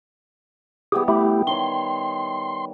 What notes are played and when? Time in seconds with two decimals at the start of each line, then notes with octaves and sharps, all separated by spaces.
0.92 E3 G3 B3 G4 G#4
1.08 A3 E4 G4
1.47 D#3 C#5 C6